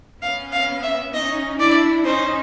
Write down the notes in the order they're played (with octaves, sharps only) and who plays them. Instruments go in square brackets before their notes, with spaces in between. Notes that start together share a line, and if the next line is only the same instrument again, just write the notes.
[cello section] B3 C#4 [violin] F5
[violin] F5
E5
[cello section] C#4 D#4 [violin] D#5
[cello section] D4 E4 [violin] D5
[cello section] C#4 D#4 [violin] C5